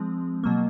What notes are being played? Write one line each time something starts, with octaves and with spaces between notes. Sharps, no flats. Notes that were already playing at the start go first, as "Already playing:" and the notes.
Already playing: F3 G#3 C4
B2 F#3 A#3